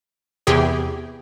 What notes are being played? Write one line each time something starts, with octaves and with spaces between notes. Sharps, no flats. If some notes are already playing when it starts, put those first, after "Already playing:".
E2 C3 G4 G#4